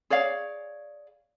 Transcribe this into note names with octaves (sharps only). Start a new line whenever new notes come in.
G#4 C#5 D5 F5